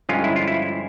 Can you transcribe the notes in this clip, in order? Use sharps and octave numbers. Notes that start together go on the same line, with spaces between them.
G2 D3 F3 G#3 C#4 F4
E4
F4
E4